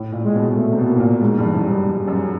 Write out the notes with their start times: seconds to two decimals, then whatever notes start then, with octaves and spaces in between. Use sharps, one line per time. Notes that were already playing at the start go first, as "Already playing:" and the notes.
Already playing: A2
0.12 A#2
0.24 G#3
0.35 B2
0.56 B2 A3
0.72 C3
0.78 B2
0.90 A#3
0.95 A2
1.00 A#2
1.21 G#2 G#3
1.38 G2
1.44 E3
1.53 F#2
1.65 G3
1.71 G2
1.87 G2
2.08 F#2